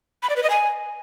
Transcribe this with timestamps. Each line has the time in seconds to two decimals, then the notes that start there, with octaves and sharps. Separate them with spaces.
0.23 B5
0.30 D5
0.36 B4
0.43 D#5
0.50 G#5